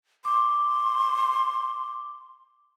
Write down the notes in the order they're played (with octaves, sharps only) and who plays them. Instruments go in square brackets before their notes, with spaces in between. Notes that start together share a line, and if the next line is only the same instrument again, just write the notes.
[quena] C6 [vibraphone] D6